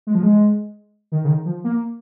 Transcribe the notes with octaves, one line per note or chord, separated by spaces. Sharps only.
G#3
F3
G#3
D#3
C#3
D#3
F3
A#3